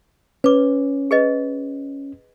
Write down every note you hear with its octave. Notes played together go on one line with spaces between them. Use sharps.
C#4 B4 D6
G#4 B4 D#5